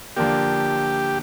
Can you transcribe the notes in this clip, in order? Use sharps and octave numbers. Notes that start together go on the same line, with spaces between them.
D3 F3 A#3 D4 G4